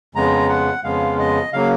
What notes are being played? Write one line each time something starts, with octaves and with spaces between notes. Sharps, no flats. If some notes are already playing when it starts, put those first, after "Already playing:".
F2 C#3 G#3 B3 A#5
F#5
F2 C#3 G#3 B3 F5
D#5
C#3 F#3 A#3 F5